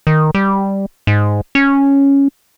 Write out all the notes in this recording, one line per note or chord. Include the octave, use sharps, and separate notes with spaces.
D#3
G3
G#2
C#4